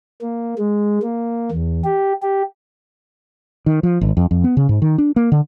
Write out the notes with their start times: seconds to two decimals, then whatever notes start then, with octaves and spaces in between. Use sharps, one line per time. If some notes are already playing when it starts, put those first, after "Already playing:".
0.21 A#3
0.58 G#3
1.02 A#3
1.51 E2
1.85 G4
2.23 G4
3.66 D#3
3.83 F3
4.01 G#1
4.17 F2
4.31 F2
4.44 B3
4.57 C#3
4.69 G#2
4.82 D#3
4.98 D4
5.16 A#3
5.32 D3